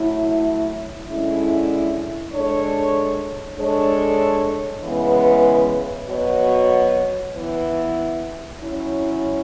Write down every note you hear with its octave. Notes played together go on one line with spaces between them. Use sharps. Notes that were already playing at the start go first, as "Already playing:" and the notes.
Already playing: F#3 A3 E4
D3 G#3 C#4 E4
G#3 D4 A4 C#5
G#3 D4 A4 C#5
C#3 E3 G#3 B3
B2 F#3 B3 F#4 C#5
E3 B3 E4
F#3 C#4 E4